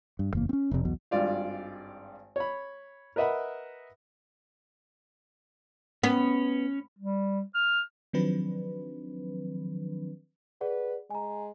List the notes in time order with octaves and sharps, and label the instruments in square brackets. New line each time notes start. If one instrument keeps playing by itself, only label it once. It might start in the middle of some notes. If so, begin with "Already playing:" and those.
[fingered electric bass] G2
F#1 E2 A#3
C4 C#4
F1 C3
B1 E2 B2
[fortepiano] G#1 G2 F4 D5 F5
C#5 B5
A#4 B4 D#5 E5 F#5 B5
[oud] B3 [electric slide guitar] C#4
[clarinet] G3
F6
[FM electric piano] D#3 F3 F#3 C4 D4 B4
[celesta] G#4 D5 F#5 [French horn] B4
[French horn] G#3 [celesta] G#5 A#5